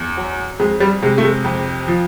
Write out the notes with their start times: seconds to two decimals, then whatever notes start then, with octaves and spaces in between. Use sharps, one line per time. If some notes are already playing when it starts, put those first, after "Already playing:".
Already playing: E2
0.17 F#3
0.59 F2 G#3
0.80 G3
1.02 C3 G#3
1.18 A3
1.23 G#3
1.44 F2
1.87 F3